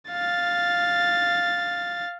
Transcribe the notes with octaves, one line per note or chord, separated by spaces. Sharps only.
F5 A6